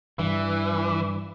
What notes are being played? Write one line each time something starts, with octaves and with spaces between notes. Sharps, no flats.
G2 E3